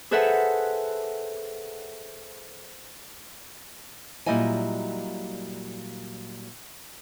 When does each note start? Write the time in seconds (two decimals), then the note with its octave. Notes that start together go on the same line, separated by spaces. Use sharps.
0.11 G#4 A4 B4 C5 E5 F#5
4.26 A#2 F#3 G3 E4 D#5 G#5